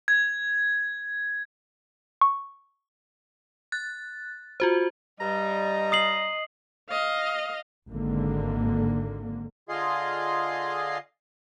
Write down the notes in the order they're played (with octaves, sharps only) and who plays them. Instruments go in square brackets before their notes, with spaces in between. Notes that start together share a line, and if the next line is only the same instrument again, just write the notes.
[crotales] G#6
[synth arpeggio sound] C#6
[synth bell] F#6 A6
F4 F#4 C5
[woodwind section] G2 G3 [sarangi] D#5 [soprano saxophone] A#5
[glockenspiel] D#6 C7 F#7
[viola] D#5 F5
[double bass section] G#1 G#2 D3 A#3
[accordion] D3 F4 G#4 D#5 F5 C6